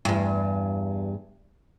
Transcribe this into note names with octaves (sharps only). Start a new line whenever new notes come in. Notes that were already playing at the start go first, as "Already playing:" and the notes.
E2 G2